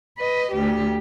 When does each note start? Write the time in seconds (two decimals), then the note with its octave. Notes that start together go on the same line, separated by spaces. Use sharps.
0.18 B4 D#5
0.53 D2 G4